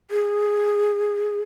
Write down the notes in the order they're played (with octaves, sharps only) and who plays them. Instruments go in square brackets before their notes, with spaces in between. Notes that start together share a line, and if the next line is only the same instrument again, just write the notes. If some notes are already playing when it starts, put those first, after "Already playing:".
[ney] G#4